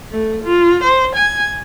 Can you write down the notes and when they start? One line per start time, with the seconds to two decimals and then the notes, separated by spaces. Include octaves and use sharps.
0.12 A3
0.43 F4
0.83 C5
1.15 G#5